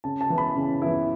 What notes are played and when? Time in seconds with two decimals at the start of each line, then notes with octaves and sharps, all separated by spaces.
0.04 C#3 A5
0.21 A5
0.30 E3 B3 E4
0.38 B5
0.56 C#3
0.82 E3 B3 E4